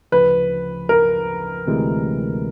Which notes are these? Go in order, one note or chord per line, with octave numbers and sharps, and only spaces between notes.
D2 C#3 F3 B4
A#4
D2 C3 E3 G#3